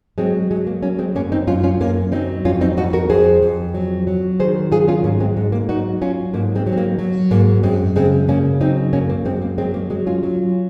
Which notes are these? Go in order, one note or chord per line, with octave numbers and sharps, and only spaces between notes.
F#3 G#3 C4
F#3 G#3
A#3
F#3 A#3 C#4
G#3 C4
F#2 A#3 C#4
C4 D#4
F#2 C#4 F4
C#4 F4
F#2 A#3 C#4
F#3 C4 D#4
F2 C#4 F4
C4 D#4
F2 D#4 F#4
F#4 A#4
F2 G#4 C5
F2
F#3
F#3
D#3 G#4 C5
F#3 F4 G#4
C#4 F4
G#2 A#3 C#4
G#3 C4
G#2 G#3
A#3
F#3 D#4 F#4
F#3 C#4 F4
G#2 A#3
G#3 C4
F#3
C4
A#3
F#3
G#2 A#3
F#2 G#3 C4
C#3 G#3 C4
C#3 A#3 C#4
F#3 C4 D#4
F#2 A#3 C#4
A#3
F#2 G#3 C4
A#3
F#3 G#3 C4
A#3
F#3 G#3
C#4 F4
F#3